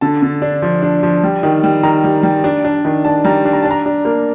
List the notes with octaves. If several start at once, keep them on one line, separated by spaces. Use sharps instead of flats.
D3 A5
D3
D4
F3
D4
F3
G3
D#3
G3
D#3 A#5
G3
G3
D4
D4
D#3
D4 A5
G3 A#5
D4
A#5
D4 A5
A#5
D4
A#3